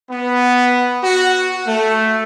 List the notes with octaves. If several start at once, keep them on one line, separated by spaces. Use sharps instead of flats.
B3
F#4
A3